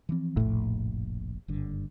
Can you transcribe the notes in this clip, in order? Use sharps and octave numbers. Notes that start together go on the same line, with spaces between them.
E3 F3 C4
F1 A#1 A2
F#1 G2 D3